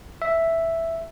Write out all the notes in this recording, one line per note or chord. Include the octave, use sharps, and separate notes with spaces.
E5